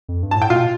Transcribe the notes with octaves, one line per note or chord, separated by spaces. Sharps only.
F2
G2
A5
A2
G5
B2 F4 F5